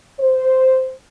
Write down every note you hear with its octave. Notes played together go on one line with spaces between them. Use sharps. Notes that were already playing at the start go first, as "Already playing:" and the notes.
C5